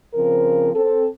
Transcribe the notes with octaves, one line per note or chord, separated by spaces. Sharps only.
C#3 F3 C4 A#4
C4 A4